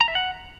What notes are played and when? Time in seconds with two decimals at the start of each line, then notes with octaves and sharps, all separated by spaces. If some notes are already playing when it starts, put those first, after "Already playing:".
0.01 A#5
0.08 E5
0.15 F#5